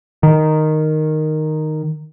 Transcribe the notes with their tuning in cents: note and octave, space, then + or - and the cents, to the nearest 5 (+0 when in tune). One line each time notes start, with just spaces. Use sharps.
D#3 -5